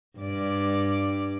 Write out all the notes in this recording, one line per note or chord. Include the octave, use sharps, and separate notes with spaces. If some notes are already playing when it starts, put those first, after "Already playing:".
G2 D5